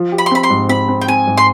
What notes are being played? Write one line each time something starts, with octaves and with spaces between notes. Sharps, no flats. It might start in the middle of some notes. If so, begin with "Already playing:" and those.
Already playing: F3
G4
B5
C6
C4 B5
C6
G#2
C4 B5
C4
G5
C4 G#5
G#2
C6